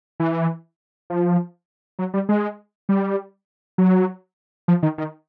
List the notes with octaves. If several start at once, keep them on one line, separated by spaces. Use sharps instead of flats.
E3
F3
F#3
G3
G#3
G3
F#3
F3
D#3
D#3